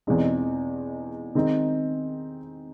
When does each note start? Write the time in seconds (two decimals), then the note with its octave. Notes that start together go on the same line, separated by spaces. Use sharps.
0.07 E2 B2 G#3 C4 D#4
1.35 D#3 G#3 C4 D#4